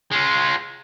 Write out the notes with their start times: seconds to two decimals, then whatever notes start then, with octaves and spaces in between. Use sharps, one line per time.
0.11 G#3 F4